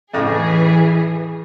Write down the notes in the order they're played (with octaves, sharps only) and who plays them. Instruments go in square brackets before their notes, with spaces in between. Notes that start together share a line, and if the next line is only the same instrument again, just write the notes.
[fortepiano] F2 A2 C#3 [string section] E3 G#4